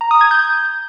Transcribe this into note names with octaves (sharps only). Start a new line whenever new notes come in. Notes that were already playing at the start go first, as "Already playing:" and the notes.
A#5
D#6
G#6
G6